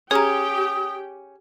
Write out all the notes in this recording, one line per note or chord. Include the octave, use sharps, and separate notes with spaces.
C#4 G4 G#4 G5 A#5 D#6